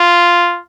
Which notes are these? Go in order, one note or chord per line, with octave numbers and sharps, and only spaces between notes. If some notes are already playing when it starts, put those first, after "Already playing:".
Already playing: F4